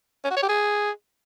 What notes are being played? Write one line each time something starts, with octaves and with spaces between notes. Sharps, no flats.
C#4
F#4
C#5
G4
G#4